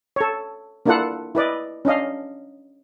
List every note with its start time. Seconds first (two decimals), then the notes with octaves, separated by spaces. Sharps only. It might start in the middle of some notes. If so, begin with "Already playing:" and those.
0.16 A4 C#5
0.86 A#3 D4 E4 F4 A4 F#5
1.35 E4 B4 D5 D#5
1.85 C#4 D4 D#5 F5